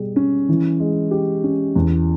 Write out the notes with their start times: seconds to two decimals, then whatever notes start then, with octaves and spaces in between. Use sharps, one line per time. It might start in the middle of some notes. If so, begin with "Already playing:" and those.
Already playing: B2 G3 G#4
0.16 C#4
0.49 E3
0.80 G#3
1.11 G4
1.44 C#4
1.76 E2